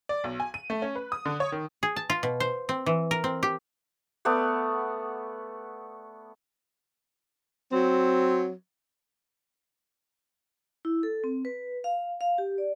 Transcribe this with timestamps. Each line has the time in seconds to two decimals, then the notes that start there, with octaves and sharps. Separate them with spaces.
0.09 D5
0.24 B1
0.40 G#5
0.54 D#7
0.70 A3
0.82 C#4
0.96 B4
1.12 D#6
1.25 D3
1.40 C#5
1.52 D#3
1.83 G#4
1.96 A5
2.10 F4
2.23 B2
2.40 C5
2.69 C4
2.86 E3
3.11 A#4
3.24 C4
3.43 G4
4.25 A3 B3 D5 F#5
7.72 F#3 C4
10.85 E4
11.03 A4
11.24 C4
11.45 B4
11.84 F5
12.21 F5
12.38 G4
12.58 D5